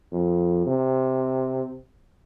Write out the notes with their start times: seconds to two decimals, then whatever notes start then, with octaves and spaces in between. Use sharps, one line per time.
0.13 F2
0.67 C3